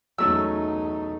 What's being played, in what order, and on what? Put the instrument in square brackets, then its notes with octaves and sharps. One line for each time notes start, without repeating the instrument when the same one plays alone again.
[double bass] E2 D#4 [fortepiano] F#3 A3 C#4 [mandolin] E6